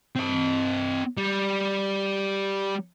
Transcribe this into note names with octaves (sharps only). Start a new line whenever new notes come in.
C4 D#5
G3